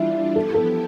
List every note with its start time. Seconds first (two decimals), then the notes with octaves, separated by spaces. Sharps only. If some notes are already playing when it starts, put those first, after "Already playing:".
Already playing: E3 G3 D4 E4 F4
0.36 F3 B3 E4 G4 A4
0.54 A4